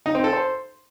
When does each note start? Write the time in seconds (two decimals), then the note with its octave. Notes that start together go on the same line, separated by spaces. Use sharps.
0.06 D#4
0.15 C4
0.24 A4
0.33 C5